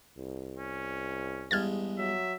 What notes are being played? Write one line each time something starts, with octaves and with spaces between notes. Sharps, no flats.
C2
C#4
E2 G2 G#3 F6 G#6 A6
F#3 E5